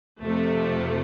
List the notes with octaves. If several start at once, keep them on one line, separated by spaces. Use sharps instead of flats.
F2 C3 F3 A3